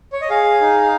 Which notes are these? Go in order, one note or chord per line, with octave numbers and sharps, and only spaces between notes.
C#5
D#5
G#4 F5
D#4